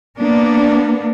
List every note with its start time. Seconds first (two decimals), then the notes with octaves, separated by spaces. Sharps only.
0.18 A#3 B3 D4